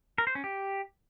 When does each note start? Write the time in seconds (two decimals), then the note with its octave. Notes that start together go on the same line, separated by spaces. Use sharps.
0.18 A#4
0.27 C5
0.35 C#4
0.44 G4